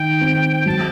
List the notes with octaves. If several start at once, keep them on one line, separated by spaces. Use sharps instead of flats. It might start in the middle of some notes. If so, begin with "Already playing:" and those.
Already playing: D#3 G5
C4
F#3 A5